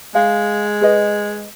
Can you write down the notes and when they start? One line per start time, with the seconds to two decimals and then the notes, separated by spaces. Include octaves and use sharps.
0.15 G#3 F5
0.81 G#4 B4 D#5